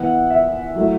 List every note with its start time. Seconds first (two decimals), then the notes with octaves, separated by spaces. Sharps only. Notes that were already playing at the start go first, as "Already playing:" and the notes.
Already playing: E3 B3 E4 F#5
0.30 E5
0.75 F#3 A3 E4